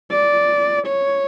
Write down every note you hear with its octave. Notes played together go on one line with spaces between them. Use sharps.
D5
C#5